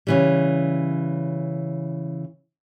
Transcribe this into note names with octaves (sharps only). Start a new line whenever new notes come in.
C#3 E3 G3